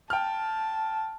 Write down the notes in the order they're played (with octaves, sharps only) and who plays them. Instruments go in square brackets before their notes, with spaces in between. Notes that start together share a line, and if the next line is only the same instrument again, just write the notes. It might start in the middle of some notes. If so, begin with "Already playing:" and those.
[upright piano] G5 F6 [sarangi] A5